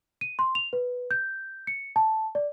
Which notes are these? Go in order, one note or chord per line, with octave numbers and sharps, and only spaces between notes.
D#7
C6
F7
B4
G6
C#7
A5
D5